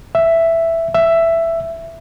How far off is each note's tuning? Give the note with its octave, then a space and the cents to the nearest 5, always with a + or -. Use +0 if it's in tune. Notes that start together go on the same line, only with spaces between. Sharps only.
E5 +5
E5 +10